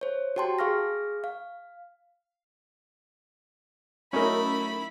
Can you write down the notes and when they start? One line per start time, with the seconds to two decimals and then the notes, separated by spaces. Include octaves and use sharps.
0.01 C5 C#5
0.36 F#4 G4 G5 A5 C6
0.59 G#4 F5 C#6 F6 A#6
1.24 F5
4.13 F#3 A3 C#4 D#4 E4 A#4 B5